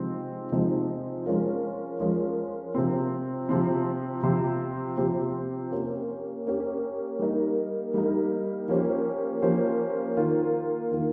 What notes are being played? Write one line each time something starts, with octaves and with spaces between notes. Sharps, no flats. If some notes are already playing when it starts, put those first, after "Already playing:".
Already playing: C3 F3 G#3 C4 D#4
C3 F3 G#3 C4 D#4
F3 G#3 C#4 F4 A#4
F3 G#3 C#4 F4 A#4
C3 F3 C4
C3 F3 C4
C3 F3 C4 G4 C5
C3 F3 C4 G4 C5
A#3 C#4 G4
A#3 C#4 G4
G3 A#3 D#4 A#4
G3 A#3 D#4 A#4
F3 A#3 C#4 G4 C5
F3 A#3 C#4 G4 C5
D#3 A#3 F4
D#3 A#3 F4